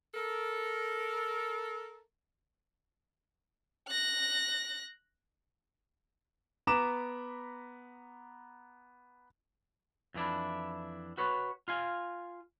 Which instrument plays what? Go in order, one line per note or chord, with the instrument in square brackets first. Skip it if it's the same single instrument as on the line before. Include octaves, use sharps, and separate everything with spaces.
[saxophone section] A4 A#4
[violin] F#6 A#6
[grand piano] B3 A#5 B5 D6 E7
[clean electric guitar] F2 E3 D4 E4
F#4 B4 C#5
F4 F5 G#5